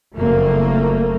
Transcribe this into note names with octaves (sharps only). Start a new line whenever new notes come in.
F#1 F2 A3 A#3